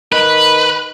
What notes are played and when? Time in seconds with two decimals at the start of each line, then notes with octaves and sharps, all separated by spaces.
0.12 D#3 B4